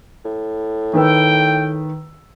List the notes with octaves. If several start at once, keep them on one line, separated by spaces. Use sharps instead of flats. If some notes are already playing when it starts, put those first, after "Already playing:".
A2
D#3 B4 G5 E6